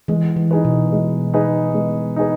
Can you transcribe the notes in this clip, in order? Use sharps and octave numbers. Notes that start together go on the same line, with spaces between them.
E3 G#3
E3
D#4 G#4 B4
B2
G#3
D#4 G#4 B4
G#3
D#4 G#4 B4